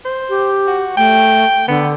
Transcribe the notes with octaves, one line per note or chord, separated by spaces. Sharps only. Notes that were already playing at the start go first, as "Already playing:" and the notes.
C5
G4
F#4
A3 G5
D3 B3